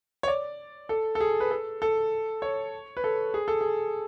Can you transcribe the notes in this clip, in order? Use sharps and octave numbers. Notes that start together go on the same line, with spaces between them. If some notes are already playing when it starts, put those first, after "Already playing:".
C#5
D5
A4
A4
G#4
B4
A4
A4
C#5
B4
A4
G#4
A4
G#4